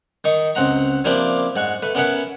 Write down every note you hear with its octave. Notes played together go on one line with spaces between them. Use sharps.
D#3 D#4 C#6
C#2 C4 F#5 A#5
F3 A#3 C4 D4 E4 G4
G#2 F#5 C#6
A3 B4
B3 C#4 A#4 C#5 E5 F#5